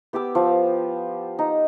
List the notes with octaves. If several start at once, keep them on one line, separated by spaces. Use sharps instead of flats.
B3 G4 D6 E6
F3
D#4